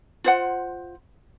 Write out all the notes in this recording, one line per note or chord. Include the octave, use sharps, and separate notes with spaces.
F4 C5 F#5